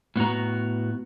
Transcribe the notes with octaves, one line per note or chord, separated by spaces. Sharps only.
A2 B3 F#4 A#5